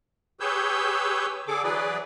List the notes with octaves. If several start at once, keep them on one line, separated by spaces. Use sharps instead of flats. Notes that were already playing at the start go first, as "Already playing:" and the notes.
G4 G#4 B4 C#5 E6 G6
D3 G#4 A4 D6
E3 F#3 G#4 B4 D5